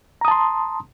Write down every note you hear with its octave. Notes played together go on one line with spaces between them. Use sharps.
A5 A#5 C6 D#6